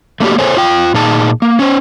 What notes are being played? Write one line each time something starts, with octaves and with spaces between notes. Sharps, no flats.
A3 A#3 D4 F#4 G4
G#4 A4 C5 C#5 G#5
F4 G5
A#2 D#4 G#4 A5
A#3
C#4 C5